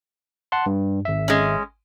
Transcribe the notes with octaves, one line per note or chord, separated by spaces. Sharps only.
F#5 A5 C6
G2
G#1 E5
G#3 C#4